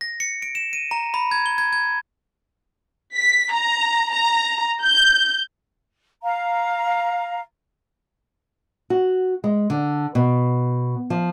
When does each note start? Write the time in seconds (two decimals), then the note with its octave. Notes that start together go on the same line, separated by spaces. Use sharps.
0.01 A#6
0.20 C#7
0.42 D7
0.55 E7
0.73 D#7
0.91 A#5
1.14 B5
1.31 G#6
1.46 G7
1.58 G#6
1.73 G#6
3.16 B6
3.52 A#5
4.12 A#5
4.84 G6
6.22 F5 A#5
8.90 F#4
9.44 G#3
9.70 D3
10.15 B2
11.10 F3